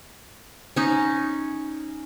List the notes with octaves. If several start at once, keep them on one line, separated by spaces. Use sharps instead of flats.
C#4 D#4